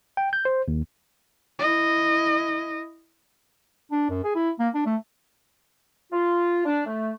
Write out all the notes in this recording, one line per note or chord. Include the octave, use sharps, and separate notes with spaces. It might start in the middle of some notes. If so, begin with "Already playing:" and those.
G5
G6
C5
D#2
E4 D#5
D4
F#2
G#4
E4
A#3
D4
A3
F4
D4
A3